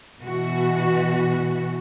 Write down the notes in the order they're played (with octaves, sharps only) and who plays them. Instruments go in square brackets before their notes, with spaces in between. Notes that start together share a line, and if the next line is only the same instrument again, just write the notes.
[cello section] B2 E3 F#4